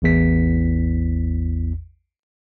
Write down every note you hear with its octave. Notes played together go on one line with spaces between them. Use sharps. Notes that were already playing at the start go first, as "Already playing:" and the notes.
A1 E2 B6